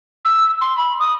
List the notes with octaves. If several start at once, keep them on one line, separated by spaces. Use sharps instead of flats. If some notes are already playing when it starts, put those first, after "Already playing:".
E6
C6
B5
D#6